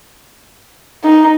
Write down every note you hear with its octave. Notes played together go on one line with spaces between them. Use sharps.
D#4